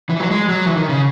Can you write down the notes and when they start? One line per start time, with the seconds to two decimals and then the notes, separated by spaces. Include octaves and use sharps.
0.10 E3
0.20 F#3
0.31 G#3
0.49 F#3
0.66 E3
0.77 D#3
0.89 C#3